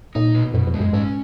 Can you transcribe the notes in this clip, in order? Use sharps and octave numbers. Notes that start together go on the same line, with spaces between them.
A#2 D#4
B2
F#2 B2
F2
G#3
F#2
G#2 C#4